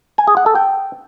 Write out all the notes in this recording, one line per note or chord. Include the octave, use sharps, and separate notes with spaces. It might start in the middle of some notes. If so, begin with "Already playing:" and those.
G#5
G#4
F#5
A4
G5